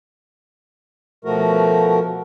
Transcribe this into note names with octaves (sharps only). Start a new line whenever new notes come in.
B2 F3 A3 F#4 A#4